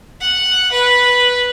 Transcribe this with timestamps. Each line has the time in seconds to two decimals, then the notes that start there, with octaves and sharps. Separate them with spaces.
0.20 F#5
0.72 B4